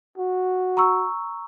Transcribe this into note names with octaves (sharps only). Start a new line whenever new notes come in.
F#4
A#5 C#6 E6